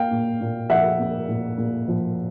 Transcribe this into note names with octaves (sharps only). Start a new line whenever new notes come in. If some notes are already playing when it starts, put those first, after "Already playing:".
Already playing: A#3 F5 G5
A#2
A#2
F3 E5 F#5
A#3
A#2
A#2
F3